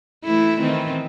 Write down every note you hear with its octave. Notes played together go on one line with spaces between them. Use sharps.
E3 A3 E4
D#3 E3 C4